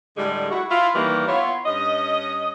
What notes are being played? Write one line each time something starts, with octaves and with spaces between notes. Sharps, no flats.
A2 D3 G3 G#3
E4 F#4
E4 F4
D#2 D#3 E3 G3 A#3
B3 E4 F4 C#5
G2 C#4 D#5